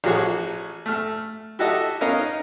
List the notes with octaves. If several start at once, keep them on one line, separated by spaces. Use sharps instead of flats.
A1 F3 F#4 G#4 C#5
A3 F6
E4 F#4 G4 A4 D#5 E5
B3 C#4 A#4 D#5 F5
D#4